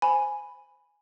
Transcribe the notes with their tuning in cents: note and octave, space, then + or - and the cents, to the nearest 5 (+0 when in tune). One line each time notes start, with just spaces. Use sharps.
C5 +0 G#5 +0 B5 +0